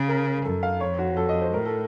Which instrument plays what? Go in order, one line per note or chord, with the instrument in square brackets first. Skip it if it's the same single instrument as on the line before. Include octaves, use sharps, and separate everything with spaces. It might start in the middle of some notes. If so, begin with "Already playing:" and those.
Already playing: [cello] C#3
[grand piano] A#4
[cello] F#2 [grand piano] A4
[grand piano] F5
[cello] F2 [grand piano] C#5
[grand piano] F#4
A4
D#5
C5
[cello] A2 [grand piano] A#4
[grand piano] A4